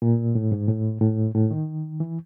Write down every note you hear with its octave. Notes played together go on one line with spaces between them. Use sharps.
A#2
A2
G#2
A2
A2
A2
D#3
E3